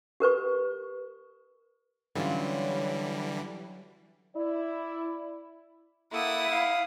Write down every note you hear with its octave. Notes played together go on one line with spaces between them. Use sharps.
G4 A#4 B4 C#6
D3 E3 F#3 G3 C#4 F4
E4 D5
A#3 E4 A4 F#5 D#6
F5